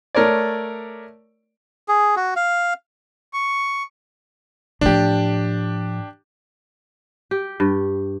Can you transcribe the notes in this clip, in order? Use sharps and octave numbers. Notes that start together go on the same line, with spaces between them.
A3 A#4 C#5 D5
G#4
F#4
F5
C#6
A2 F3 D4 G4
G4
G2